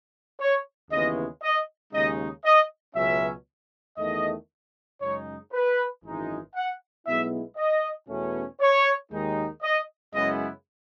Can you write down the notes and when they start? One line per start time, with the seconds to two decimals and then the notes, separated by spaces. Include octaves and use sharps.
0.39 C#5
0.90 D#2 C#3 E3 G#3 B3 D#5
1.41 D#5
1.92 D#2 C#3 G#3 D#4 D#5
2.44 D#5
2.95 C#2 B2 F#3 C#4 E5
3.97 E2 D#3 A3 D#5
5.00 F#2 C#3 G#3 D#4 C#5
5.52 B4
6.03 G#1 F#2 E3 G#3 D#4
6.55 F#5
7.05 B1 B2 G#3 B3 E4 E5
7.56 D#5
8.08 E2 B2 A3 C#4
8.60 C#5
9.11 D#2 D#3 G#3 D#4
9.62 D#5
10.13 F#2 C#3 G#3 B3 E4 D#5